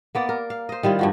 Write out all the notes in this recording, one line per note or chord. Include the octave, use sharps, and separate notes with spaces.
A#3 B3 D5
A#4
F5
C5 D#5
D#3 G3 E4 F4
G2 F3 F#4